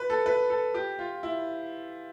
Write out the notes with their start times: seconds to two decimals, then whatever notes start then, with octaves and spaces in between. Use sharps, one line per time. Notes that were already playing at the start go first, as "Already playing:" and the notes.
Already playing: B4
0.10 A4
0.26 B4
0.50 A4
0.74 G4
0.99 F4
1.23 E4